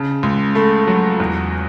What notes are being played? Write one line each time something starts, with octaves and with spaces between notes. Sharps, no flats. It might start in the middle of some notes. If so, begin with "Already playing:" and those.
Already playing: C#3 A5
C#2
A3 B5
F#3
E2